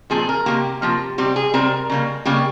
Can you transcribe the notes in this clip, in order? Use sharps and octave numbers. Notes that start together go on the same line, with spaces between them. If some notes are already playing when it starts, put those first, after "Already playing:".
A#2 F3 C4 G#4
A#4
C3 F3 A#3 G4
C3 F3 A#3
C3 G3 C4 G4
G#4
C3 G3 C4 A#4
C#3 G3 A#3
C#3 G3 A#3 G4